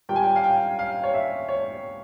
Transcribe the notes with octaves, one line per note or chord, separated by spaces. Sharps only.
A#2 G3 G5
G#5
G5
F5
G5
F5
C#5
E5
C#5